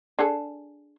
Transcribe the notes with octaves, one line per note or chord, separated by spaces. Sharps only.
D4 G#4 A4